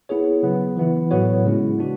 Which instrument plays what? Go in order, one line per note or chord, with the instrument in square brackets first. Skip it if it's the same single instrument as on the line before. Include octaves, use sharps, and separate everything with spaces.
[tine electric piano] B3 E4 G#4 C#5
C#3 F#3 B3
E3 B3 E4
A2 F#3 B3 F#4 C#5
C#3 G#3 C#4 E4
B3 D4 F#4